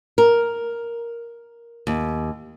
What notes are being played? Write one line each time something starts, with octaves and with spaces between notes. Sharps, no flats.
A#4
D#2